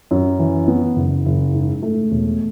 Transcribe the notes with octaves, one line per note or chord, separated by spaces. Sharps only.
F#2
E3
B3
F#1
F#1
G#2
A3
E1